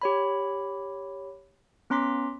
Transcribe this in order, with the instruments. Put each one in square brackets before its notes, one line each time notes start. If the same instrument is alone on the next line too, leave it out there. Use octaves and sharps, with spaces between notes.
[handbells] G4 C#5 B5
B3 C#4 A#5 C6 D6 B6